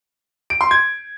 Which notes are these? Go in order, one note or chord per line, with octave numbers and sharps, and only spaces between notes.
D7
C6
G#6